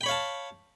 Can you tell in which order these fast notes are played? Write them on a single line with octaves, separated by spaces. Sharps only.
G5 B5 C#5 F5 A5